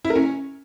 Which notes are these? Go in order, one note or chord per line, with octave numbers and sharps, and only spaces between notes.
E4
A#4
C#4